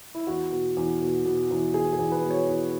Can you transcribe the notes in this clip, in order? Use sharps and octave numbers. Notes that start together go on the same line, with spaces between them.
E4
E2 F#4
B2
E2
B2
B2
E2
E2 G#4
G#4
E2
B4
B2
C#5
E2